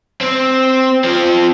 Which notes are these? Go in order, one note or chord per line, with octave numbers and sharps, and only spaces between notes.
C4
F3 C4